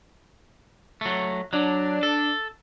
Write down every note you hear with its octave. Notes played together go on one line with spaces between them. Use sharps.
F#3 A3
F#3 D4
A4